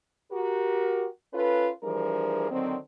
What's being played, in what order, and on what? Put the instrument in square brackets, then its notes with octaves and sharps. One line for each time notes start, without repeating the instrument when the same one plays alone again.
[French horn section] F#4 G4 A#4
C#4 F4 A4 B4
E3 F3 G3 D4 G#4 A#4
D3 D#3 F#3 C4